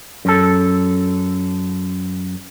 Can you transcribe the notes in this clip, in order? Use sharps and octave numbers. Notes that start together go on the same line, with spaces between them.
F#2 A4